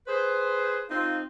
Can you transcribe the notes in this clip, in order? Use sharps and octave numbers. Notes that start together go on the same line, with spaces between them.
G#4 B4 C5
C4 D#4 F4